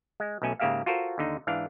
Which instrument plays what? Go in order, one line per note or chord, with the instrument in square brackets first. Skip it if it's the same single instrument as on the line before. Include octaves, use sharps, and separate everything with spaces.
[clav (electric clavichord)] G#3
B1 B2 A3 C#4 G#5
G#2 C#3 A#3 G4 E5 F5
F4 F#4 A4 A#4 C5
D#2 D3 D#4
G#2 E3 D4 F5